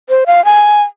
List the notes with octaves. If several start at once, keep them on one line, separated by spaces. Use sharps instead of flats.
C5
F5
G#5